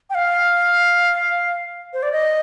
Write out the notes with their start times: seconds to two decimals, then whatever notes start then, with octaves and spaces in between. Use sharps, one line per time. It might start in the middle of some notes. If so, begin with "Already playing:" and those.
0.10 G5
0.15 F5
1.93 C5
2.03 D5
2.12 D#5